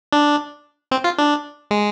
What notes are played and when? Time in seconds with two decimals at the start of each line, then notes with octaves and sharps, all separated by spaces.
0.12 D4
0.92 C4
1.04 F4
1.18 D4
1.71 G#3